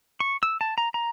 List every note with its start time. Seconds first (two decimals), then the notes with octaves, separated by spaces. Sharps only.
0.20 C#6
0.43 E6
0.61 A5
0.78 A#5
0.94 A#5